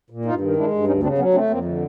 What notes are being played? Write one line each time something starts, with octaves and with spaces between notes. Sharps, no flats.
A#2
G2 D#4 F4
D#3
G#3 D4 E4
G2
D2 C#4 D#4
C#3 C4 D4
F#3 B3 C#4
A3 C4 D4
F2 A#3 C4
D3